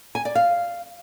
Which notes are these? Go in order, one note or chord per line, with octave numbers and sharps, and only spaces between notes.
G#5
D5
F5